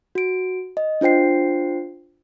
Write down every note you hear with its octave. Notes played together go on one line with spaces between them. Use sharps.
F#4 D7
D#5
D4 F4 C5 G5 C7